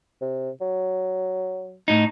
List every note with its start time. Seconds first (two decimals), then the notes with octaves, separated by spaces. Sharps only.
0.21 C3
0.61 F#3
1.88 A2 D#4